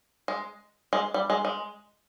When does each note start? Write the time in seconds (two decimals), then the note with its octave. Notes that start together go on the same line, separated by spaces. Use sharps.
0.28 G#3
0.93 G#3
1.14 G3
1.30 G#3
1.45 G#3